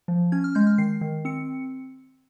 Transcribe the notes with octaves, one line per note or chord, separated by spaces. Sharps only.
F3
C#4 G#6
F6
G#3 G6
F6
D#3 C7
D#3
C4 C#7